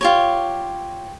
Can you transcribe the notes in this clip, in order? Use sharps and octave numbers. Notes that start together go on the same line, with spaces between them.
F4 G4 C#5